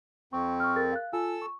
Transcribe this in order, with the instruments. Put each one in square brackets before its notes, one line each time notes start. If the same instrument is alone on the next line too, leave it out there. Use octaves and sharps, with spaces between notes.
[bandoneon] F2 C4 [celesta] C#6
[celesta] C#6 F6
G#4 A#4 A6
F5 F#6
[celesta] F4 G#5 [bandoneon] A4 E6
[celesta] C#6